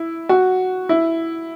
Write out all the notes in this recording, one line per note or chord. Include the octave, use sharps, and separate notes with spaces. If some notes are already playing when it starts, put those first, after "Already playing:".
Already playing: E4
F#4
E4